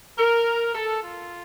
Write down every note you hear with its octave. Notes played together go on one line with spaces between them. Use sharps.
A#4
A4
F4